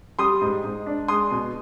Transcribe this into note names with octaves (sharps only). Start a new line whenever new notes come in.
G3 C6 D#6
G#2
G#2
D4
G#3 C6 D#6
B2